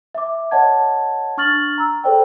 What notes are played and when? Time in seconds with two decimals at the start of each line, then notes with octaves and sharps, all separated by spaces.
0.15 E5 D6
0.51 C#5 D#5 F#5 A5 G#6
1.37 D4 C#6 F6 A6 F#7
1.78 A#5 E6
2.04 G#4 A4 C5 D5 G5